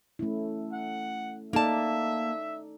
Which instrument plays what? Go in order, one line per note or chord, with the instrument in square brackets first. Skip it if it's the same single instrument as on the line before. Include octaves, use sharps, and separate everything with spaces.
[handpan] A3 C#4 E4
[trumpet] F#5
[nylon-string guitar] A#3 A5 [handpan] D#4 A4 D5 [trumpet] E5